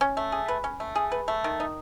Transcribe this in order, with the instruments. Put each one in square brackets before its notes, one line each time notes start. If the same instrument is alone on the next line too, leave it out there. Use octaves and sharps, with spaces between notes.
[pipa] C#4
A3
G#4
B4
C#4
A3
G#4
B4
A3
D#3
D#4